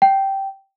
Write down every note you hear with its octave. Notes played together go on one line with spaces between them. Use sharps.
G5